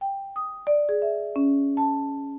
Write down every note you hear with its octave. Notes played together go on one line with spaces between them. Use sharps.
G5
D#6
D5
G#4
E5
C#4
A5